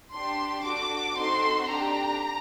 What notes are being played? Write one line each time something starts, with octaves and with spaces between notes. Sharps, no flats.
D4 G4 C6
D4 F#4 A4 D6
C4 D#4 F#4 A4 C6
D4 G4 A#5